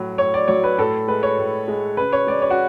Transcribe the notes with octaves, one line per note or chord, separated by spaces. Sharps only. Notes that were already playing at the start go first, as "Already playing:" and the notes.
Already playing: A2 F#3
A2 C#5
D5
F#3 C#5
B4
A2 A4
G#3 B4
C#5
A2
G#3
C#3 B4
C#5
G#3 D5
C#5
F#4